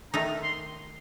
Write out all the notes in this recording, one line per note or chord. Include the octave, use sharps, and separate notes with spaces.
D#3 A3 D#4 A#5
C6